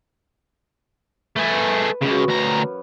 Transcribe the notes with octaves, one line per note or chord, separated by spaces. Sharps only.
A3 G#4 B4
C#2 F#2 C#3 B4 F5
D2 A#5